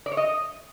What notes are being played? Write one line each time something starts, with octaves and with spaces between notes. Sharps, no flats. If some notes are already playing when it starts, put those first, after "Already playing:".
D5
C#5
D#5